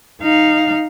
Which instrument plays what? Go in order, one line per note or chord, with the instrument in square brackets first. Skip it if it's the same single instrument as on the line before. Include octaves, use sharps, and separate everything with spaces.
[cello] D#4 F5